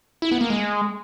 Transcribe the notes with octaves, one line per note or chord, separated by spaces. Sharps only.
E4
B3
A#3
G#3